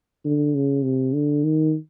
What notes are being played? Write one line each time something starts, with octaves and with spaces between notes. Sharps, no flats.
D3
C#3
C3
D3
D#3